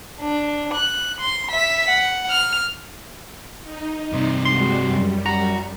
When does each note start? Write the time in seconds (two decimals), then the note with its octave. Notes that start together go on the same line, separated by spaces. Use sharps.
0.21 D4
0.74 F#6
1.21 C6
1.51 E5 B6
1.89 F#5
2.30 F6
3.62 D#4
4.13 G2 C3
4.45 G3 G#3 F#4 C6
4.87 F#2 G3
5.26 F#4 A#5